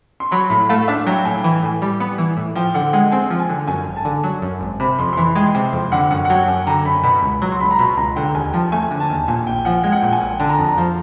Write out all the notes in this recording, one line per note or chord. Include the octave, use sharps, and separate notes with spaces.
C6
F#3 B5
A2 B5
A3 F5
D4 E5
F#3 G5
A2 G#5
E3
A2
G3
B3
E3
A2
F3 G5
D3 F#5
G#3 F#5
C4 G#5
F3
G#5
D3
F#2 G#5
G#1
A5
D3
F#3
F#2
G#1
C3 B5
F2 C6
C6
E3 B5
G#3 G5
C3 G5
F2
D3 F#5
F#2 F#5
F#5
F#3 G5
F#2 G#5
D3 A#5
F#2 B5
B2 B5
C#2
F#3
C6
C#2 B5
A#5
B2 B5
C#2 A#5
D3 G5
D#2 G#5
F3 A5
A3 G#5
D3
A5
D#2
A#2 G#5
A#1 G5
F3 F#5
G#3 G5
F#5
A#2 G5
G#5
A#1
D3 A5
A#5
F2 A5
A#5
F3